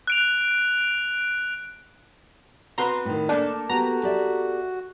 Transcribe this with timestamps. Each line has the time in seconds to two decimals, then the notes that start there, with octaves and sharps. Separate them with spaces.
0.07 F#6 D7 F7
2.78 C4 F#4 B4 A#5 C6
3.05 A2 D#3
3.29 A3 A#3 D4 A4 G#5 A5
3.69 B3 F#4 G4 A#5
4.03 G4 D5 E5